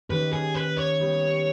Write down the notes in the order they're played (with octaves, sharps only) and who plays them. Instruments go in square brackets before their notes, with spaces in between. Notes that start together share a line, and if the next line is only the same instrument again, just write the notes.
[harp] D#3 A#3 C#4 G4 [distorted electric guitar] B4
[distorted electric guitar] G#4
B4
C#5
[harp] G3 B3 G4 B4